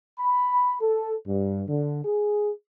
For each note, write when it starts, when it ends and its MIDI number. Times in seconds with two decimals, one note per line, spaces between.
0.19 0.75 83
0.81 1.13 69
1.26 1.62 43
1.68 2.02 50
2.04 2.51 68